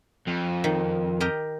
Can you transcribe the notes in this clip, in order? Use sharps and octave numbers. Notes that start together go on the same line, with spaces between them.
F2
D#3
G4 A#4 D#5